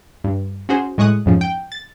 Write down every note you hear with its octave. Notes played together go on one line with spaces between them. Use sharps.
G2
C#4 F#4 G#4 C5
A2 G#3 C#6 D#6 F#6
F2 G#2 C#3 F3
G5
A6